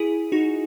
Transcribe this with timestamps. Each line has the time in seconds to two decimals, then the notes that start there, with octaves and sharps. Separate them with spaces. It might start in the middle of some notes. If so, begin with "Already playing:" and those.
Already playing: E4 G#4
0.32 D#4 F#4